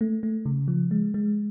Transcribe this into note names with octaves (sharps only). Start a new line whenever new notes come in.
A3
A3
C#3
F3
G#3
G#3